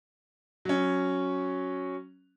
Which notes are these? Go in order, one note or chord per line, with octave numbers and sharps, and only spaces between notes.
F#3 C#4